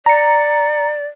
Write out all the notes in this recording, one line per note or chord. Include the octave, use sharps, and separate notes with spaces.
D5 A#5 C#7